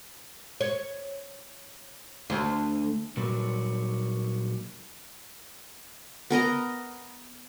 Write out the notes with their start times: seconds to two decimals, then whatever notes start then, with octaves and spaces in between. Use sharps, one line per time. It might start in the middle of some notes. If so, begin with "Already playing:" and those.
0.61 C#5
2.30 D2
3.17 A#2 F#3 G3
6.30 B3 A#4 D#5 A#5